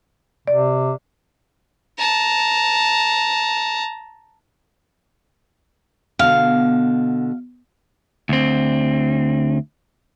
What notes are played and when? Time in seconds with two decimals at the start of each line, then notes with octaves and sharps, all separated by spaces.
0.48 C3 D5
1.98 A5 A#5
6.19 B2 D3 F5
8.29 D2 C4